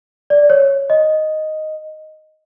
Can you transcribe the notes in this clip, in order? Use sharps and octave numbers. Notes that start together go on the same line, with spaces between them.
D5
C#5
D#5